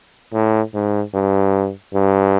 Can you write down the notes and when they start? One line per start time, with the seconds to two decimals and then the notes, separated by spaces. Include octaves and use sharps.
0.33 A2
0.74 G#2
1.14 G2
1.94 G2